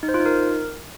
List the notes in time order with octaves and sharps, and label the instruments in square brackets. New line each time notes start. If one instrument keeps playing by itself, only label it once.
[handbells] D#4
C5
F4
D#4
A#4